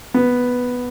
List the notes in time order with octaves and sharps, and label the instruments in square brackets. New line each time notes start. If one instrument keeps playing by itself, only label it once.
[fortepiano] B3